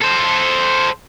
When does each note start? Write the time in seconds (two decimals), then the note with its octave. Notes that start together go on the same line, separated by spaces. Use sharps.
0.01 A4 C5